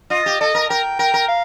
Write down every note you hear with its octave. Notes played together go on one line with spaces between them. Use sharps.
F4 D#5
G4
A4 D#5
A#4
A#4 G5
A#4 G5
A#4
F5